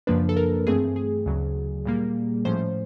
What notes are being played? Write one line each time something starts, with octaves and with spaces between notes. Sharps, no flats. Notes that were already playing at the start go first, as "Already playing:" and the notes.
F#2 C#3 F3 A#3 D4 B4
A4
A#4
G2 E3 A3 C4 G#4
G#4
D2 C#3 F#3
A#2 G3 A#3
A2 F3 A3 C#4 C5